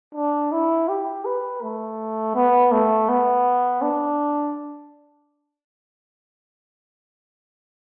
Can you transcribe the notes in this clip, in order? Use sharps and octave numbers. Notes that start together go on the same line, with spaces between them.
D4
E4
G4
B4
A3
B3
A3
B3
D4